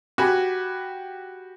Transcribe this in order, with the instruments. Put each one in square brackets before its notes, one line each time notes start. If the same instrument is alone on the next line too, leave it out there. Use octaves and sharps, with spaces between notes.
[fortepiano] F#4 G4 G#5 B5